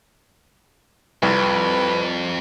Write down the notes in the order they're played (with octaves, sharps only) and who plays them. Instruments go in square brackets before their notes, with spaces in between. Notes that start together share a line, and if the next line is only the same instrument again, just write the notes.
[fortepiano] C2 [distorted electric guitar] F2 [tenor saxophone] B4